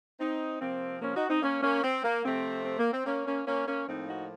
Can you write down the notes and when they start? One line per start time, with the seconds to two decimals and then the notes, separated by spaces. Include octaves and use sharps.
0.20 C4 D#4
0.61 C3 F3 A#3 C4
1.02 A#3 C#4
1.16 D#4 F#4
1.29 C4 D#4
1.42 A#3 C#4
1.63 A#3 C#4
1.84 C4
2.04 A#3
2.25 C3 F3 A3 C4
2.65 C4
2.79 A#3
2.93 C4
3.06 A#3 C#4
3.27 A#3 C#4
3.47 A#3 C#4
3.67 A#3 C#4
3.88 A2 F3 A#3 C4 D#4
4.09 D#4 F#4